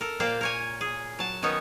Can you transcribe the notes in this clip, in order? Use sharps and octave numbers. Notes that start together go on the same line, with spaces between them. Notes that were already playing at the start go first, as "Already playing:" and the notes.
A4 A#4
A#2 A#3 C5 D5 F5 G5
A#4 C#5 G#5
G#4
F#3 A5
D#3 B3 C#4 D#4 C#5